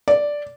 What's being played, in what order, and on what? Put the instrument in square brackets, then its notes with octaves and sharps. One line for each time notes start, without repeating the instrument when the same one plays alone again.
[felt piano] D5